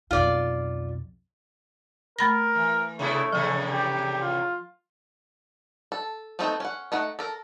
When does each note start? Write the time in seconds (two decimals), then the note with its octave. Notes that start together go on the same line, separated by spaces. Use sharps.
0.11 B1 F2 F4 D5
2.19 A3 A#4 B5 A#6
2.55 E3
2.99 C3 A3 B3 E4
3.33 E2 A2 C3 F3
3.72 G4
4.22 F4
5.92 A4
6.39 A3 B3 C4 D#4 A4
6.60 C#4 F#5
6.92 A3 D#4 F#5
7.19 A4 A#4